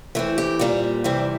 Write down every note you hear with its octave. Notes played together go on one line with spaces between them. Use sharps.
E3 A3 C4
G4
A#2 G3 C4
C3 E3 G3 C4